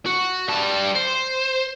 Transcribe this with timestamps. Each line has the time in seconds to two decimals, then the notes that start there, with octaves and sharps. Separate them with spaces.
0.06 F#4
0.49 G3 A5
0.96 C5